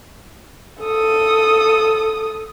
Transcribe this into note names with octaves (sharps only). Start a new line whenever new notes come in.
A4 D#6